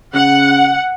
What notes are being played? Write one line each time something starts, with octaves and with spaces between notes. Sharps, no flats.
C#3 F#5